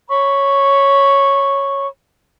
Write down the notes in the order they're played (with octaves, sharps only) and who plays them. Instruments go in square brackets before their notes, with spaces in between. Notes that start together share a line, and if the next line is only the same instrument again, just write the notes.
[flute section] C#5 B5 C#6